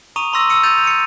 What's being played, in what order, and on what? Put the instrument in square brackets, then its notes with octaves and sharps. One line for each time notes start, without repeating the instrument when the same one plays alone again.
[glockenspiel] A#5 C#6 D#6 D#7 F7
A#5 C6 C#6 E6 A#6
E6 C#7 D#7
G6 A6 D#7 F7
C#7 D#7